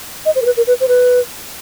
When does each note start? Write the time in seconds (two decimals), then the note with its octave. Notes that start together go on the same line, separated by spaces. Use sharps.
0.25 D#5
0.35 C5
0.42 A#4
0.45 B4
0.57 A#4
0.67 B4
0.80 C5
0.88 B4